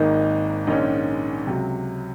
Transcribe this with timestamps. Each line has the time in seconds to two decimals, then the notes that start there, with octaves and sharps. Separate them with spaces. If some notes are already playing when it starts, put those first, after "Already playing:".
Already playing: G#1 G#2 D#3 A#3 D#4
0.67 A#1 G#2 D#3 G#3 C#4
1.47 C#2 C3 F#3